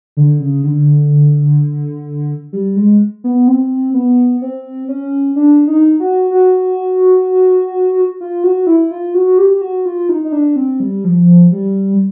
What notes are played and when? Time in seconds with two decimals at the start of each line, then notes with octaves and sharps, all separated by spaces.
0.17 D3
0.40 C#3
0.64 D3
2.53 G3
2.76 G#3
3.24 B3
3.48 C4
3.94 B3
4.42 C4
4.88 C#4
5.36 D4
5.67 D#4
6.00 F#4
6.31 F#4
8.21 F4
8.44 F#4
8.67 E4
8.91 F4
9.14 F#4
9.38 G4
9.61 F#4
9.86 F4
10.09 D#4
10.24 D#4
10.32 D4
10.56 C4
10.80 G3
11.04 F3
11.51 G3